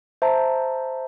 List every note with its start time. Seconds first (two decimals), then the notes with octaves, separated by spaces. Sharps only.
0.22 C5 E5 A5 A#5